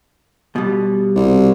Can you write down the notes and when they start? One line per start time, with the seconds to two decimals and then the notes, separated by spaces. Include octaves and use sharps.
0.56 B2 G3
1.15 C2